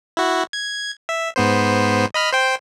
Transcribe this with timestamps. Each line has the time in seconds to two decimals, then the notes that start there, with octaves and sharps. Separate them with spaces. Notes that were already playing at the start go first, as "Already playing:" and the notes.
0.17 E4 F#4
0.53 G#6
1.09 E5
1.36 G#2 B3 C5
2.14 D#5 B5 F6
2.33 C5 G5